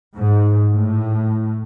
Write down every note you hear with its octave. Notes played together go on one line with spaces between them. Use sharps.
G#2
A2